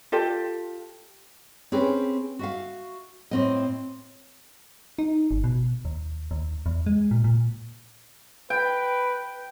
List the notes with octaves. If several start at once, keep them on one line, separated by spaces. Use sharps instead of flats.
F4 G4 A4 D5
C4 C#4 G4 G#4 B4
F#4 E5 F5
A2 C4 D#5
D#4
G1
B2
D#2
D#2
E2
G#3
A#2
A#2
B4 G5